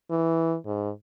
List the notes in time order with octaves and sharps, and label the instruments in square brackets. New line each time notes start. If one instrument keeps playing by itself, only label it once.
[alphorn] E3
G#2